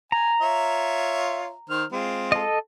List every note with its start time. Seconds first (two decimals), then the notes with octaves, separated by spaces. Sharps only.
0.12 G#5 A#5
0.41 F4 C#5 E5
1.70 D#3 C5 F6
1.92 G#3 C4 F4
2.32 A4 D#5